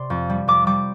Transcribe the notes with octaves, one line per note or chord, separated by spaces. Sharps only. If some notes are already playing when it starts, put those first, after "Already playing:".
Already playing: C3 D5 C6
F2
G3
F2 D6
G3 D6